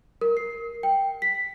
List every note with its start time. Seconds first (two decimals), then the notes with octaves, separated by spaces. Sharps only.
0.21 A#4
0.37 C7
0.83 G5
1.22 B6